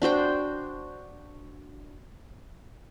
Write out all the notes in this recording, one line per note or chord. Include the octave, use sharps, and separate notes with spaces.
D4 F#4 C5 G5